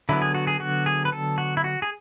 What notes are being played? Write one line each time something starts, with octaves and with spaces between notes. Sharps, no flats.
D3 F#3 B3 E4
G#4
F#4
G#4
F#4
G#4
B4
A4
F#4
E4
F#4
G#4